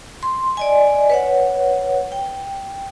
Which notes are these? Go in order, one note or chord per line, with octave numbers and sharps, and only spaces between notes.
C6
D5 D#5 G#5
B4 C#5 F#5
G5